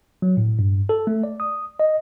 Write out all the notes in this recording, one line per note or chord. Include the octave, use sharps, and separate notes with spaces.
F#3
A2
G2
A4
A3
D5
D#6
D#5